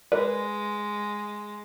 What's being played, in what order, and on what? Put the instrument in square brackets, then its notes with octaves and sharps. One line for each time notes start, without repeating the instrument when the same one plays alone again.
[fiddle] G#3 [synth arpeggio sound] A#4 D5 [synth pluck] B4